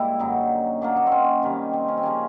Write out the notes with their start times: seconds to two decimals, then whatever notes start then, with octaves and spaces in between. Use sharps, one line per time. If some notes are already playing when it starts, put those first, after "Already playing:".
Already playing: G#2 G3 A#3 E4
0.19 F#2 D3 F#3 D#4
0.81 A#2 F#3 A#3 D4
0.97 D#4
1.07 C4 C#4
1.43 C3 D#3 G3
1.73 C4
1.88 C#4
1.98 C4
2.03 C#3 F3 A#3 C#4